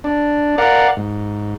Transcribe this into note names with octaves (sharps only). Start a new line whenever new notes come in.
D4
A#4 D5 F5 F#5
G#2